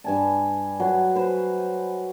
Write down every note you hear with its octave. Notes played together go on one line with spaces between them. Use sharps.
G2 G#5 A5
F#3 B4
B4 C5